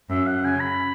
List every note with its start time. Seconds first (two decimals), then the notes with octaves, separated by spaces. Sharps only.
0.09 F#2 E5
0.26 F#5
0.44 C#3 G#5
0.60 B5